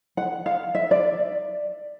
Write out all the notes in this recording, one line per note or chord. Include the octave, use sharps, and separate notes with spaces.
F#5
F5
E5
D5